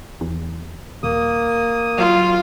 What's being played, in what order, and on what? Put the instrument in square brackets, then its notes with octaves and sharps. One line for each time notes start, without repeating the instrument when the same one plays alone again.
[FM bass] E2
[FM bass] D#1 [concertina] A#3 D#6
[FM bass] F#3 [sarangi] F4